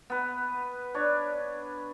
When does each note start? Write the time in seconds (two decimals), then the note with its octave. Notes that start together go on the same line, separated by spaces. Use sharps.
0.10 B3 B4
0.94 D4 C#5